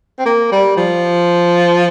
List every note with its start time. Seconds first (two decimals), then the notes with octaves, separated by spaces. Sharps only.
0.19 C4
0.25 A#3
0.52 G3
0.77 F3